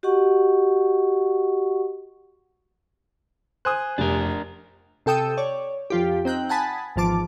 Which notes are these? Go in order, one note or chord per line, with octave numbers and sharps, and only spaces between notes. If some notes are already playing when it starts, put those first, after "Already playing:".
F#4 G4 D#5 F#5 C#6
C5 G#5 D#6 F#6
F1 D4 G4 A#4
C3 A4 G5 D#6 E6
C#5 D5
F2 F4 G4
C4 D#4 G5 F#6
F#5 G#5 A5 B5 D#6
G#1 E2 F3 A5 D6